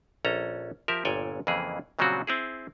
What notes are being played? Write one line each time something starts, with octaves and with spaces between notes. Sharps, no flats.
A#1 C#4 A4 A#5
F3 G4 A#4 E5
G1 A#2 C#5 D5 G5 G#5
F2 C#3 E3 A#3 E4 G#4
A#2 C#3 F#3 G3 C4 F#4
C4 E4 G#4